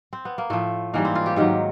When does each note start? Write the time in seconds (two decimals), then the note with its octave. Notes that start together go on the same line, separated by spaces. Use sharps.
0.13 C4
0.25 B3
0.38 A#3
0.50 A2 F3 A3
0.93 G#2 E3 G3 A#3
1.05 C4
1.15 F4
1.26 G4
1.36 G#2 D#3 F#3 G4